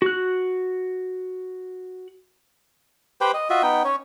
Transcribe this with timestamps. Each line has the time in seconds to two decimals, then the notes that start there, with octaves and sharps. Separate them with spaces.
0.02 F#4 F#6
3.21 G4 B4 C5 G5
3.34 D#5
3.50 F4 F#4 D#5 E5
3.63 B3 D#4 G5
3.84 C#4 C#5